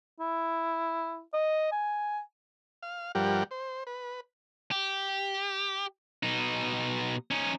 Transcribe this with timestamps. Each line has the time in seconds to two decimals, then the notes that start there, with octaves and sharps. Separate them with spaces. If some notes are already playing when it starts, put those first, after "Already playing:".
0.20 E4
1.34 D#5
1.72 G#5
2.83 F5
3.15 G2 F3 G3 G4 A#4 F#5
3.51 C5
3.87 B4
4.71 G4
6.23 B2 D#4
7.31 C#4 D#4